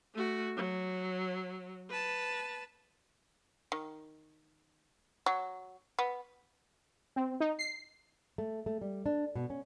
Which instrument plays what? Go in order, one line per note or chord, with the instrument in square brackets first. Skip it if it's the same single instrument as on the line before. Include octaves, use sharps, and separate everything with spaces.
[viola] A3 F#4
F#3
B4 A5
[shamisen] D#3
F#3
B3
[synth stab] C4
D#4
C7
[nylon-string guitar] A3
A3
G3
D4
B2
C#4